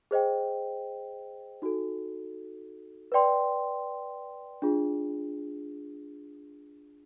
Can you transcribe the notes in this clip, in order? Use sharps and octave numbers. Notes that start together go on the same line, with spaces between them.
G#4 C5 D#5 G5
D#4 F#4 A4
B4 D5 G5 C6
D4 F4 G#4